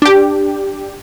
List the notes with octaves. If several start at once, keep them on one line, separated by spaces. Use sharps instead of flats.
D4 G4